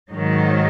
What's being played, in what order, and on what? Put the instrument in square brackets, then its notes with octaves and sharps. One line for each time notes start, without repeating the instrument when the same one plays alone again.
[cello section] G#2 D#3 F#3